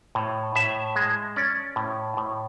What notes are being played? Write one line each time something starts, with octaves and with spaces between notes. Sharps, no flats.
A2
A2 E5
G#3
C#4 D5
A2
A2